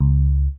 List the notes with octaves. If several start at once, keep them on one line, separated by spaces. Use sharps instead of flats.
C#2